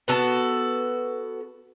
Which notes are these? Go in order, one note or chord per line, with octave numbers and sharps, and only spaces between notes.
B3 F#4 A4